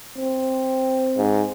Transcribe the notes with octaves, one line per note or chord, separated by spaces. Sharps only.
C4
G#2